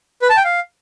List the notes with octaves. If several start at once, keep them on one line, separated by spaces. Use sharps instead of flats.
B4
A5
G5
F5